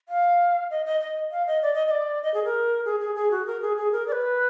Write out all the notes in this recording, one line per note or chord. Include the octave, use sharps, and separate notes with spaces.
F5
D#5
D#5
D#5
F5
D#5
D5
D#5
D#5
D5
D#5
G#4
A#4
G#4
G#4
G#4
F#4
A#4
G#4
G#4
A#4
D5
B4